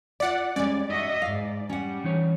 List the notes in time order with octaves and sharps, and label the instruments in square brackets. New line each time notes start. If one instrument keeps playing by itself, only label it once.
[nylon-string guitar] F4 E5 [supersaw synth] D5 F#5
[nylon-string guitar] G3 G#3 [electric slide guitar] C#4 G#5 [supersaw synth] D5
[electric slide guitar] D#4 [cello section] F#4 D#5 E5
[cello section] G#2 [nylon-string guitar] E5 F5
[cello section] G3 [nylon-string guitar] C#4 F#5
[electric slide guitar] E3 D#4 C#5